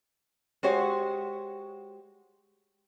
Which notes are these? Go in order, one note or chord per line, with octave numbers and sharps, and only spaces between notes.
G#3 F#4 G4 C5 C#5 F#5